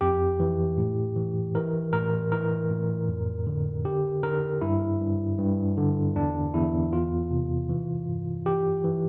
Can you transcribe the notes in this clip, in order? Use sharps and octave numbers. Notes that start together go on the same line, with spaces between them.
F2 G4
E3
A2
E3
E3 A#4
A2 A#4
E3 A#4
A2
F2
D3
D3 G4
D3 A#4
G2 E4
G2
G2
D3
E2 D4
E2 E4
E2 F4
C3
E3
G2
E3 G4
E3